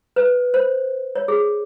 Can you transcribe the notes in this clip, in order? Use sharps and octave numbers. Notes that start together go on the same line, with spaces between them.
B4
C5
C#5
G#4